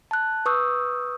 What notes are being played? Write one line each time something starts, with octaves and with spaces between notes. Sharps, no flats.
A5 F#6
B4 C#6 D#6 E6 G6